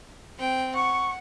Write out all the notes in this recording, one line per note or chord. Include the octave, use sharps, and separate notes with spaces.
C4 G5
F#5 C#6